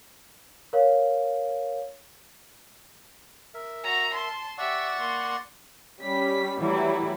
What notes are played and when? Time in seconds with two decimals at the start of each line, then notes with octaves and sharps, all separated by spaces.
0.73 A#4 C#5 F5
3.54 A#4 E5
3.84 F#4 A#5
4.14 A5 C6
4.58 G4 D5 E5 F#5 C#6
4.97 A#3 C6
6.01 G3 C#4 B6
6.59 E3 F#3 G3 A3 E4